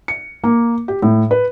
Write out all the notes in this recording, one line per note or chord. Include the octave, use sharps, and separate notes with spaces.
C#7
A#3
G4
A2
B4